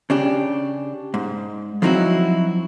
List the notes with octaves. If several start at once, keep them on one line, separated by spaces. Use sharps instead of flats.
C#3 D4 G4
G#2
F3 F#3 C4 D#4 E4 F#4